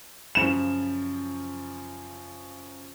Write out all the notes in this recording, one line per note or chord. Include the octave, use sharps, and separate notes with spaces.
F#2 C#3 F3 E7